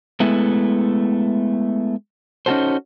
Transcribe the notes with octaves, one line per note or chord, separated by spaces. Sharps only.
G#3 A3 B3 E4
C#4 D#4 F4 F#4 A4 C5